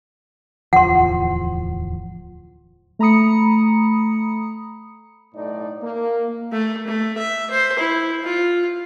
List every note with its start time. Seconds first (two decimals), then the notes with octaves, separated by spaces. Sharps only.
0.73 D1 E2 F3 F#5 C6
2.99 A3 A#5 B5 D#6 C#7
5.34 B1 A2 D#4 D5
5.82 A#3
6.52 A3
6.88 A3
7.19 E5
7.50 C5
7.79 E4
8.24 F4